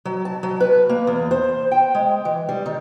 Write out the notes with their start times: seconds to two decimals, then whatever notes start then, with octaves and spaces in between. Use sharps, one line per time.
0.05 F#3
0.25 A5
0.43 F#3
0.60 B4
0.89 A#3
1.07 E2
1.31 C5
1.72 G5
1.95 G#3
2.25 E3
2.49 G3
2.66 D#3